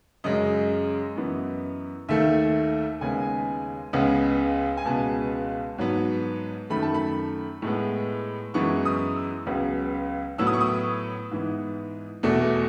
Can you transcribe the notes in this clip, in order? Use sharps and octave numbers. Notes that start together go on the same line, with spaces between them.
F#2 C#3 G#3 D#5
F#2 E3 B3
D#2 D#3 A3 E5
D#2 C#3 G#3 B3 G#5
C#2 C#3 G#3 B3
G#5
C#2 B2 G#3 B3 A5
G#2 F#3 B3
F#2 D#3 A3 B5
A5
B5
A2 G#3 B3
F#2 E3 G#3 B3 C#6
D#6
E6
C#2 C#3 F#3 B3
A2 F#3 B3 E6
D#6
C#6
D#6
G#2 E3 B3
E2 B2 A3